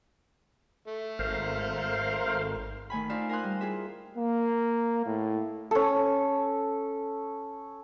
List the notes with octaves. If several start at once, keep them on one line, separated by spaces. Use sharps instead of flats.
A3
G#1 A#4 C5 F5
D#3 A3 G#5 B5
D#4 F4 C5 D5 E5 F5
A#4 F5 G#5 C6 D#6 F#6
G3
E4 F4 G#4 E5
A#3
A2
C#4 A4